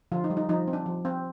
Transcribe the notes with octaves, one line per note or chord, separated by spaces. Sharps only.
D3 F3 F4
D#4
G3
D#4
F3 D#4
C4
D4
F3
C4